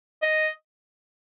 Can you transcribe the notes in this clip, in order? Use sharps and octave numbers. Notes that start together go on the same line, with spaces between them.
D#5